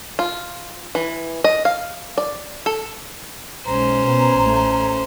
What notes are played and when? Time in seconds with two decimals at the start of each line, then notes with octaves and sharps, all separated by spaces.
0.19 F4
0.95 E3
1.44 D#5
1.65 F5
2.18 D5
2.66 A4
3.66 B1 G#3 C#4 C5 A#5
4.05 B2 B3
4.38 A1 A3